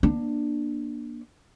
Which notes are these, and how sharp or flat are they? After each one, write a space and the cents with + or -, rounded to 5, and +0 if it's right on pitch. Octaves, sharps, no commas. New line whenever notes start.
A#3 +30 D4 +10